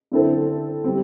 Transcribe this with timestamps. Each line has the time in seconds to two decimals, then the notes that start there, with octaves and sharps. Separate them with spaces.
0.12 D3 C4 E4 A4 C5
0.84 G3 C4